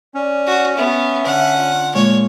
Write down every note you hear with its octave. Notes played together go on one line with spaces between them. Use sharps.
C#4 D5
F#4
B3 E5
D3 F#5
F4
A#2 G#3 C#5